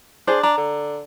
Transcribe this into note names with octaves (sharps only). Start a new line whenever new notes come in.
D4 G#4 C5
D4 A#5
D3